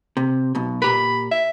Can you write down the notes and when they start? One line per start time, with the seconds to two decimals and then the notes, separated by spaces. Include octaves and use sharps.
0.17 C3
0.55 B1 B2
0.82 A#2 G4 A#4 B5
1.31 E5